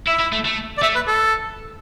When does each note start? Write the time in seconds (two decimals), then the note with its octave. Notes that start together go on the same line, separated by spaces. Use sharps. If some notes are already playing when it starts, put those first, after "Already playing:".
0.07 E4 E5
0.20 E4
0.32 A3
0.45 A3
0.77 D5
0.82 A3 E5
0.95 B4
1.07 A4